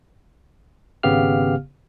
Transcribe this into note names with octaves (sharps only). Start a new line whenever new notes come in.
G#1 C#3 B3 G4 F5 F6